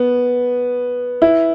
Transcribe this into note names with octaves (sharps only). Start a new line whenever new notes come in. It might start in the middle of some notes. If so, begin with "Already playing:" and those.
Already playing: B3
E4